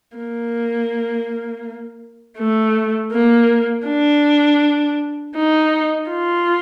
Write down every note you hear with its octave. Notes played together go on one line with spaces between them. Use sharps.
A#3
A3
A#3
D4
D#4
F4